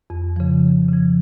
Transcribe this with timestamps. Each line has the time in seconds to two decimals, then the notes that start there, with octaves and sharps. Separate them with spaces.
0.10 F2
0.36 C#3 F3
0.63 F2
0.89 C#3 F3